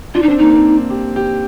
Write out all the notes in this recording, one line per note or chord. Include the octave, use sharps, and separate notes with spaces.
D4 F4
D#4
C4 D4
A#3 D#4
C4
G4
G4